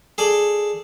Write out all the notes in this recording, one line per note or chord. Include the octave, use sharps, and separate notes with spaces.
G#4 A4 D5